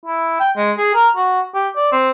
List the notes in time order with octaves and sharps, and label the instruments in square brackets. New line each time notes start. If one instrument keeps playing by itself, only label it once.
[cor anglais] E4
G5
G#3
G#4
A#4
F#4
G4
D5
C4